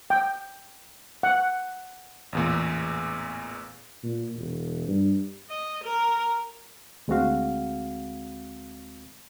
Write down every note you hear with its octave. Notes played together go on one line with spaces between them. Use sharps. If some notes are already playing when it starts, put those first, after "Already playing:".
G5
F#5
A1 E2 A#2
A#2
E1
G2
D#5
A#4
D2 G#3 C4 F#4 F5